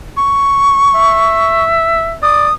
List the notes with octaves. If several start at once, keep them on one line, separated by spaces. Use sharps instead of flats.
C#6
E5
D5 D#6